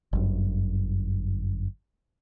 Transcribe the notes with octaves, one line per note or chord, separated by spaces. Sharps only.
G1 F#2